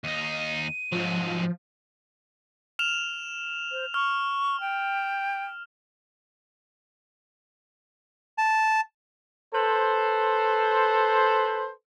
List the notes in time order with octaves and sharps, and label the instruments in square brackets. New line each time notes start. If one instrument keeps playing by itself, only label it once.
[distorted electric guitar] D#2 D#4 [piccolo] D#7
[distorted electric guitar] G#2 F#3 [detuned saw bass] F3
[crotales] F6 E7 F7
[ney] C5
[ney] C#6 [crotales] F6
[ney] G5
[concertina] A5
[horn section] A4 B4 C5